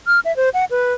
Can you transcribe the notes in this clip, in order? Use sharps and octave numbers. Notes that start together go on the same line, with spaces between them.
F6
E5
C5
F#5
B4